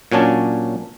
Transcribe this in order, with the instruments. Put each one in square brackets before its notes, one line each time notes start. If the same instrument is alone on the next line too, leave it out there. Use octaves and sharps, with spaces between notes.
[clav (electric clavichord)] A#2 F#3 C#4 D4 A5